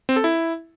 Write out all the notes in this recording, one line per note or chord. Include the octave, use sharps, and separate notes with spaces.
C4
A4
E4